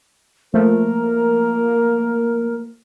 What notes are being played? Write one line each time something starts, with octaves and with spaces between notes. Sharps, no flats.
F3 A3 A#3 A#4